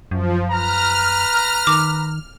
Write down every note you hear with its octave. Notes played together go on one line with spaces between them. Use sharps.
F#2 F3
B4 A#5 F6
D#3 D6